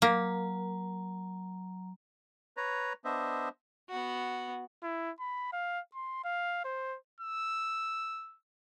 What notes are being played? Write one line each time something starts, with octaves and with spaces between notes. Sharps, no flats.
F#3 A#3 A#5
B4 C#5 A#5
B3 D4 C5 D#5 E5
B3 F#4
E4
B5
F5
C6
F5
C5
E6